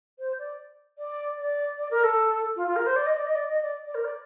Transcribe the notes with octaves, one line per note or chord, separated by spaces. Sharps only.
C5
D5
D5
D5
D5
A#4
A4
F4
F4
A#4
C5
D5
D#5
D5
D#5
D5
D#5
D5
D5
A#4
D5